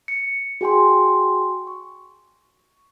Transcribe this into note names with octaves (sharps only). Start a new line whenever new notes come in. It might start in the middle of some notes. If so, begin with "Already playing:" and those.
C#7
F#4 G#4 G5 G#5 C6
C#6